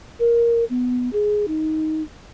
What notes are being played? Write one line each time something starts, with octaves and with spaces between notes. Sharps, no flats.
A#4
B3
G#4
D#4